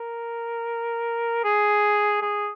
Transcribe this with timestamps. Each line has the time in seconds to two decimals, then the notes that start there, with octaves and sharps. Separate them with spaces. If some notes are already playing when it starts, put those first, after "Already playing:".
Already playing: A#4
1.44 G#4
2.22 G#4